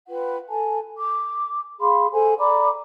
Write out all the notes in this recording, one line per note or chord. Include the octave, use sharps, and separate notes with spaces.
F4 B4 F#5 G5
A4 G#5 A5
D6
G#4 F5 B5 C6
A4 C5 F#5 G#5
D5 A#5 B5 D6